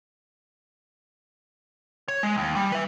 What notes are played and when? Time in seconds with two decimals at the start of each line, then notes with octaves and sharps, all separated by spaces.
2.08 C#5
2.23 G#3
2.38 D#2
2.56 G3
2.72 B4 E5